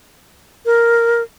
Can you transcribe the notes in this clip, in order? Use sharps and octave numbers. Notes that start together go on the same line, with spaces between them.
A#4